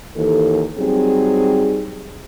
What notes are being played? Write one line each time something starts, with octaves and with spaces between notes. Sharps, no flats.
D#2 E3 A4
F#3 G3 C4 D#4 G#4